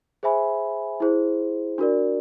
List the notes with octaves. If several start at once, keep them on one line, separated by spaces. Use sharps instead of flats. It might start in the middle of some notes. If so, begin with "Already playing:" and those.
G#4 C5 E5 G#5 B5
E4 G#4 C5
D4 F#4 A#4 D5